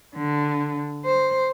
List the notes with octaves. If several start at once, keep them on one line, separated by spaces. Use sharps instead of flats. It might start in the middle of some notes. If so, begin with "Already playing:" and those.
D3
C5